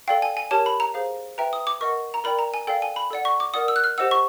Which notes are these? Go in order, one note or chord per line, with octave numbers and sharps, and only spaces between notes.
A4 D5 F5 G5
G#5
G#5
G4 A#4 C#5 A5
B5
A#5
G#4 C5 F5
B4 E5 G5 A#5
D#6
D6
A#4 D#5 F#5 C#6
A#5
A#4 D5 G5 B5
A#5
G#5
A4 D5 F5 G5
G#5
B5
A4 D5 F#5
C#6
D6
A#4 D5 F#5 D#6
E6
F#6
F6
G4 C5 D#5 F#5 E6
C#6